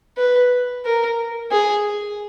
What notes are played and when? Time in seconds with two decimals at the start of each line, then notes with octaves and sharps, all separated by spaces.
0.18 B4
0.85 A#4
1.51 G#4